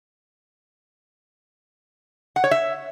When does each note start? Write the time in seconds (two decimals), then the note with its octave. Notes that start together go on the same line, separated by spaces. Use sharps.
2.36 F#5
2.44 C#5
2.51 E5